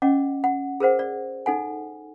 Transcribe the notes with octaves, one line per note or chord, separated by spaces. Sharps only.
C#4 D#5 F#5 D6
F#5
G#4 A#4 C5 F#5
D5
D#4 A4 F#5 G#5